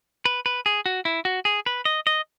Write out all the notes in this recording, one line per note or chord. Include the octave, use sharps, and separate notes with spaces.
B4
B4
G#4
F#4
E4
F#4
G#4
B4
D#5
D#5